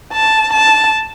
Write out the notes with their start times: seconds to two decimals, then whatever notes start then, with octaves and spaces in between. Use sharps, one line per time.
0.13 A5
0.53 A5